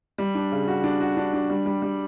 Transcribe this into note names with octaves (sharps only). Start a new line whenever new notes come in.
G3
D4
C#3
F#4
D4
F#4
D4
D4
G3
G3
G3